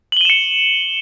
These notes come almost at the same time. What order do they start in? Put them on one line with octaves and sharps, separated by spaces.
F#7 G7 D#7 E7 C#7